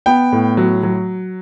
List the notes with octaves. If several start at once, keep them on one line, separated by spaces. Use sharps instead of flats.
B3 G5
A2
F#3
F#3